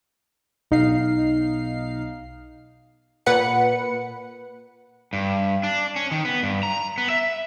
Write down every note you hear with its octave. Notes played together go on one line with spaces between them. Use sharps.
B1 D#4 F5 C7
A#2 B4 F#5 C#7
G2
D4
C#4
D#3
B3
G2
A#5
B3
E5